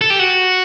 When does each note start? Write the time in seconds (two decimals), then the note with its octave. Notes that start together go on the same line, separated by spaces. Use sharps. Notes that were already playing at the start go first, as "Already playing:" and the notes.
0.01 A4
0.10 G4
0.19 F#4